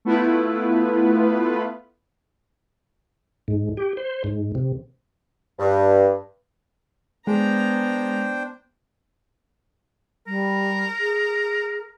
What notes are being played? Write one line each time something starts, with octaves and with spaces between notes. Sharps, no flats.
A3 B3 E4 F4 B4
G#2
G4
C5
G#2
C3
G2
G#3 B3 D4 C5 G5 A#5
G3 A#4
G#4